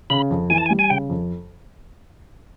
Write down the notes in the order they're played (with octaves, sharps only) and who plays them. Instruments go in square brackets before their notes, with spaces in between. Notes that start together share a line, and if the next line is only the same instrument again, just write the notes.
[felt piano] C#3 [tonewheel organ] B5
[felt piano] F2
[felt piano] E3 [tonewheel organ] G#5
[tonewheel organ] A5
G#5
[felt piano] G3
[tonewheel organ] G#5
[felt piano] C#3 [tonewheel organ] G5
[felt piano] F2